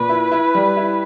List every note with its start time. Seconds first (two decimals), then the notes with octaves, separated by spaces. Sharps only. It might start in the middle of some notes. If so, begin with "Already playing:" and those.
Already playing: A#2 B4
0.09 E4
0.32 E4
0.55 G3
0.77 E4